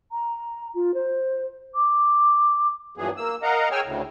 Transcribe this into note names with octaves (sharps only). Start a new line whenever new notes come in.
A#5
F4
C5
D6
G2 A#2 E3 F#3 B3 G#4
A#3 E6
A#4 D#5 F5 F#5 A#5
G#4 C#5 G5 G#5 E6 F6
D2 A2 C#3